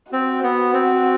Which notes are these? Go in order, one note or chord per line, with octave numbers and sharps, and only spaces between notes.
C4 F#4
B3
C4